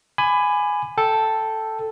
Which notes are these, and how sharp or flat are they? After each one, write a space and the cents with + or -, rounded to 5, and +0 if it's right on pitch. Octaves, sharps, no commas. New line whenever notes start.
G#5 +0 B5 +20 D6 +20
A4 +0 G5 +0